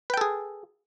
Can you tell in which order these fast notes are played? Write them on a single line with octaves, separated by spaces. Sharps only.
B4 G5 A4 G#4